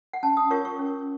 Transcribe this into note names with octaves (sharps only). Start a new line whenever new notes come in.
F#5
C#4 A5
D#6
F4 A#4 C#5 C#6
C#6
C#4